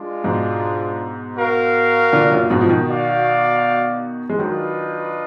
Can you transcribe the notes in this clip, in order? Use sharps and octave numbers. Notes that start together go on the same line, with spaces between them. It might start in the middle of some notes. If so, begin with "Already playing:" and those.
Already playing: G#3 D4 F4
G#2 B2
F#4 A#4 F5
A#2 D3
F#2 A#2
G#2 B2
F3
B2 D#3
F#4 D5 F5
G#3
D#3 F#3 D4 F4 B4 D#5